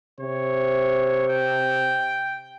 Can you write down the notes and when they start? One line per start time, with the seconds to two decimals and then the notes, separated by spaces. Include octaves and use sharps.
0.20 C3 C#5
1.29 G5